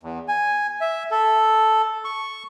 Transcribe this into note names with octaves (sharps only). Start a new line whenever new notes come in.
E2
G#5
E5
A4
C#6